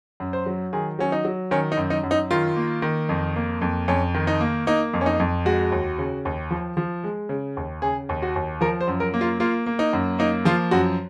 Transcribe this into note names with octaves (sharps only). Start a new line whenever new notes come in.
F#2
C5
F#3
D#3 G#4
F#3 C#4
D#4
F#3
D#3 C#4
D#4
F#2
D#4
F#2
D#4
D#3 F4
A#3
D#3
F2
A#3
F2
F2 C#4
D#3
D#4
A#3
A#3 D#4
F2
C#4
D#4
F2
G#3 F#4
D#2
C#3
D#2
F3
F3
G#3
C#3
D#2
C#3 G#4
D#2
F#4
D#2
F3 A#4
C5
F#2
A#4
A#3
F4
A#3 F4
A#3
D#4
F#2
A#3 D#4
F3 F4
F#2 F#4